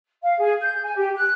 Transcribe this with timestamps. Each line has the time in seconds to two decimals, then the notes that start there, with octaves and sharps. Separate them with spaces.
0.22 F5
0.39 G#4
0.61 G6
0.83 G#5
0.95 G4
1.16 F#6